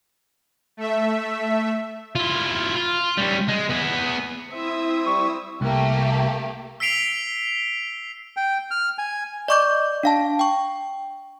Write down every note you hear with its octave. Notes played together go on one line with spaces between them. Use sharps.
A3 E5
E4 F4
F4
G3 C#4
G#3
B3 G#4
C4 E4 E5 D#6 E6
G3 C#6
C2 A3 A#3 G4
E6 B6 C7 D7 F7 G7
G5
F6
G#5
D5 D#5 C#6 D6 G6
D4 F5 A5
G5 C#6